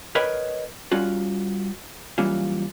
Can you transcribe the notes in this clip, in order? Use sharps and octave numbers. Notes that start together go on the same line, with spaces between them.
A#4 B4 C#5 D#5 G5 B5
G3 C#4 F4 F#4
E3 F#3 G3 A#3 C#4 F4